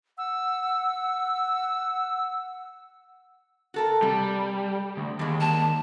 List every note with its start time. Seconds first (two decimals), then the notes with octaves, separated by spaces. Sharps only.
0.18 F#5 E6
3.74 F#4 A4 A#4
4.02 C3 G3
4.97 D2
5.19 D#2 G3 G#3
5.41 A5